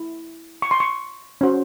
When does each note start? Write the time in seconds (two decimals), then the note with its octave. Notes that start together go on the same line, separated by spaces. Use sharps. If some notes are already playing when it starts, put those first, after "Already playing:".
Already playing: E4
0.62 C#6
0.71 C6
0.80 C#6
1.41 C#4 F#4 C5